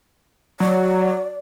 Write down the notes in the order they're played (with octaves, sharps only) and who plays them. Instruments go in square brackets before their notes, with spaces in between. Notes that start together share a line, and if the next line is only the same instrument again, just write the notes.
[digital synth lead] F#3 [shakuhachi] D5